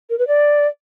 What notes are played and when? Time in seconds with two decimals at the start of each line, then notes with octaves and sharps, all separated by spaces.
0.10 A#4
0.19 B4
0.27 D5